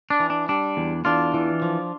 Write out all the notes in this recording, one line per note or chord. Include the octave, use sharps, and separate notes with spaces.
D4
E3
D4
G3 D4
E2
E2 D4 F4
E3
F3